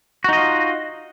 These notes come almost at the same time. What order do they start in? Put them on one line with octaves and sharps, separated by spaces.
F#4 D#4 D#5 F4